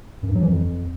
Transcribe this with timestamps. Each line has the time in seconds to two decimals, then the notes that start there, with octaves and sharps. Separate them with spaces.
0.23 F#2
0.29 G2
0.35 F#3
0.41 E3
0.47 F2